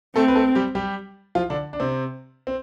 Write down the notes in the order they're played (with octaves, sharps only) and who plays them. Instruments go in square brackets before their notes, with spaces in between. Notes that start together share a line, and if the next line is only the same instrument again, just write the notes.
[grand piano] A3 A4 [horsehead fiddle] C4
[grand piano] B4
A3 A4
G3 G4
G3 G4
F3 F4
D3 D4
D4
C3 C4
C4